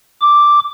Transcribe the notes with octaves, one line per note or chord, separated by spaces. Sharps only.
D6